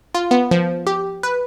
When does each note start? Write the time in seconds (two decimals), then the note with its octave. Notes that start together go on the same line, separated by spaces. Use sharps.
0.14 F4
0.31 B3
0.51 F3
0.87 G4
1.23 B4